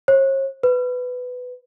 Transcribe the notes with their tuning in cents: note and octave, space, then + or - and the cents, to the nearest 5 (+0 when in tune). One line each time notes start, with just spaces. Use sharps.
C#5 -45
B4 +10